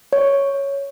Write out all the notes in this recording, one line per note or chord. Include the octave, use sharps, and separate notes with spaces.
C#5